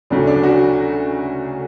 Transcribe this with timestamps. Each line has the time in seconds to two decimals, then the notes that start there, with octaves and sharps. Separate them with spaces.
0.10 D2 C#3 F#3 A3 D4
0.27 D4
0.43 F#4